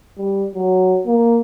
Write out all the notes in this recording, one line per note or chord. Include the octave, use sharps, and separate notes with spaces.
G3
F#3
A#3